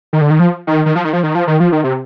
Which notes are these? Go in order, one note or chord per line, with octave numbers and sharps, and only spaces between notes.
D#3
D3
D#3
F3
D#3
D#3
F3
D#3
F3
D#3
F3
D#3
F3
D#3
C3